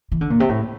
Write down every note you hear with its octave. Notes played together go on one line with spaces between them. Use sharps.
E3
D3
A#2
C3
A2